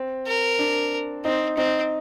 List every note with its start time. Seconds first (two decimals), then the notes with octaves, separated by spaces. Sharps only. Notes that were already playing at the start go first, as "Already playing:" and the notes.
Already playing: C4
0.27 A#4
0.59 D4
1.24 C4 D#4
1.57 C4 D#4